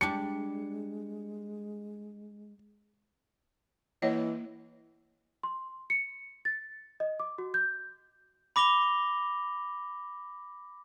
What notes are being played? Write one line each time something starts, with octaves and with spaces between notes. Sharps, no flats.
G3 G#3 D4 C#7
E3 A#3 C#5 D#5
C6
C#7
A6
D#5
D6
F#4
G6
B5 D6 A#6 F7 G7